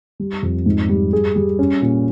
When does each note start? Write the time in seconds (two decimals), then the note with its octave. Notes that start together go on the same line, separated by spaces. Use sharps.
0.20 G3
0.42 F2
0.66 G#2
0.89 G3
1.13 G#4
1.36 G3
1.59 C#4
1.82 A#2